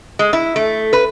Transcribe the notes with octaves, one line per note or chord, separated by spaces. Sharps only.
G#3
E4
A3
B4